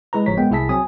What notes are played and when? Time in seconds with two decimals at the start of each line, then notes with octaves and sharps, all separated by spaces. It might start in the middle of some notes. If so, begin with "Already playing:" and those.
0.13 G#3 E4 B4 A#5
0.26 G1 A2 F3 C#5 B6
0.37 G#3 A#3 B3 G5
0.50 C2 E4 G#4 E5 A5 B6
0.69 F#3 C4 G#5 D#6